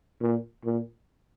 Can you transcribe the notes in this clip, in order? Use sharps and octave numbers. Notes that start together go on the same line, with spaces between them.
A#2
A#2